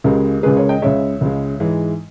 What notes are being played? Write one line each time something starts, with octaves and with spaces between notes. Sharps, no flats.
C#2 C#3 G#3 G4 A#4
C#2 C#3 G#3 G#4 B4
A#4 C#5
D#5 G5
C#2 C#3 G#3 C#5 E5
C#2 C#3 G#3
G#2 E3 G#3